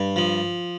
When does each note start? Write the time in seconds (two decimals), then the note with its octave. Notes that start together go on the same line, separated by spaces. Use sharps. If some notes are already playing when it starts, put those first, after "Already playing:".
Already playing: G2
0.16 F3